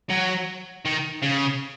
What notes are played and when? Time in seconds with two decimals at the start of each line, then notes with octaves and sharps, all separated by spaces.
0.10 F#3
0.85 D#3
1.23 C#3